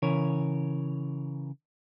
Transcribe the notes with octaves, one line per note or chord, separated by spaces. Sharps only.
C#3 E3 A#4 C#5